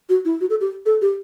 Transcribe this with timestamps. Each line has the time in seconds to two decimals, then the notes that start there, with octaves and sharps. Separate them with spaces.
0.09 F#4
0.25 E4
0.41 F#4
0.50 A4
0.61 G4
0.86 A4
1.02 G4